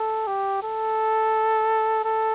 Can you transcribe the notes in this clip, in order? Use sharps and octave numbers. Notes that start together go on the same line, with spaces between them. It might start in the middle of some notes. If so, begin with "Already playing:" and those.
Already playing: A4
G4
A4
A4